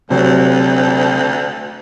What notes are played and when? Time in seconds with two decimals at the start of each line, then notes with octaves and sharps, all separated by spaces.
0.10 D2 C3 F#3